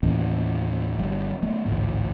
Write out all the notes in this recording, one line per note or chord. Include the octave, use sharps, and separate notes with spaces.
D#2 A2 E3 C#4
G1 F#3 G3
F#3 A3 B3
A1 D2 G#2